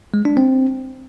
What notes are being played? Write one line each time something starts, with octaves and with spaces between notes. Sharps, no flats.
G#3
D4
C4